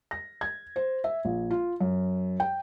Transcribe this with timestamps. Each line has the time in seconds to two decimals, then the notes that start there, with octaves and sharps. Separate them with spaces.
0.11 A#6
0.41 G#6
0.76 C5
1.04 E5
1.25 A#1
1.51 F4
1.81 F#2
2.40 G5